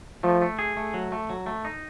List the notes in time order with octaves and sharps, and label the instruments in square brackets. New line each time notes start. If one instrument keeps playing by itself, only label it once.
[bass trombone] F3 [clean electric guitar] A3
[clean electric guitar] A3
G#4
A3
F#3
A3
F#3
A3
D#4